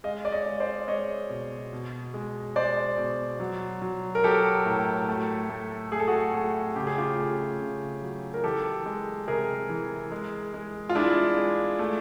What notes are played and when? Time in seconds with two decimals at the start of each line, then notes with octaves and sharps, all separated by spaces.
0.04 G#3 D#5 F5
0.25 D5
0.32 C#5 D#5
0.46 G#3
0.60 C5 D5
0.88 G#3 C#5 D#5
1.30 B2
1.73 B2
2.14 G#3
2.56 G#3 C5 D5
2.98 B2
3.40 F#3
3.82 F#3
4.15 A#4
4.24 F#3 G4 A4
4.66 A2
5.08 A3
5.50 A3
5.92 A3 G#4
6.00 A4
6.08 F#4 G#4
6.34 A3
6.76 C#3 G4
6.87 G#4
6.98 F4 G4
7.18 A3
7.60 C#3
8.02 F#3
8.34 A#4
8.44 E3 G4 A4
8.86 G#3
9.27 C3 G#4 A#4
9.69 E3
10.12 G#3
10.54 G#3
10.89 F4
10.95 G#3 D4 E4
11.37 G#3
11.79 A3